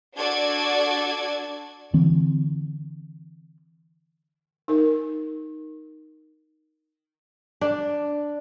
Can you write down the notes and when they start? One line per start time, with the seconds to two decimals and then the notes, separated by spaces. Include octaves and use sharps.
0.17 D4 F#4 A4 D5 A5 G#6
1.93 D3 E3 C4
4.68 D#4 A#4
7.61 D4